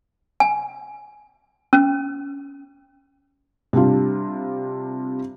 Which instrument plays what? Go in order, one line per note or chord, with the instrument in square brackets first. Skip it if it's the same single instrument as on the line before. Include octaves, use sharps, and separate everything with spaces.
[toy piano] G#5
C#4
[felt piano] C3 G3 D4 F4